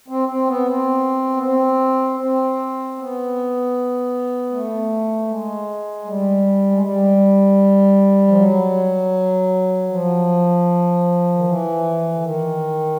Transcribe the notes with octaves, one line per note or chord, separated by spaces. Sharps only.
C4
C4
B3
C4
B3
C4
C4
B3
A3
G#3
G3
G#3
G3
F3
F#3
F3
D#3
E3
D3
D#3